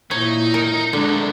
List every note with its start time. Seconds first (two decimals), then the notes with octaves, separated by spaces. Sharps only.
0.11 A#2 D#4 E4 C#5
0.54 A#4
0.93 C2 B2 D3 G#3